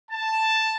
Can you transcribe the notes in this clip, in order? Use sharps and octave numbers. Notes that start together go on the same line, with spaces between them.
A5